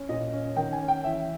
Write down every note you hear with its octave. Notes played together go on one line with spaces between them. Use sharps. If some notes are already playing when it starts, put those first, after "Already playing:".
Already playing: C#4
A#2 D#5
C#4
D#3 G5
G#5
C#4
G5
E3 E5